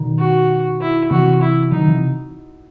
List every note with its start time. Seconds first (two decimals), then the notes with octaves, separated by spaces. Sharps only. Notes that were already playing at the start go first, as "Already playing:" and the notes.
Already playing: B2 D#3
0.19 F#4
0.81 E4
1.11 C3 E3 F#4
1.41 E4
1.72 D#3 F#3 D#4
1.88 C3 E3